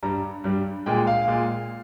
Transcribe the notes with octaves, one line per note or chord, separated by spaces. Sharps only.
G2 G3 A#5
G2 G3
A#2 G#3 G5
F5
A#2 G#3